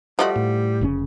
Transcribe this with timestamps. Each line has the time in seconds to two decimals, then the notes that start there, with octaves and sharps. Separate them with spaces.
0.19 F3 G3 A3 F#4 D#5
0.36 A2
0.81 F1 C#3 C#4